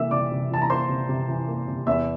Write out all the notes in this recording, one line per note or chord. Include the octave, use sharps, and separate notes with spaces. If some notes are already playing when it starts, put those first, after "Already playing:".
Already playing: C3 E3 A#3 E5 E6
C3 D5 D6
C3
E3 A5
A#5
A#3 C5 C6
C3
C3
E3
A#3
C3
E2 E5 E6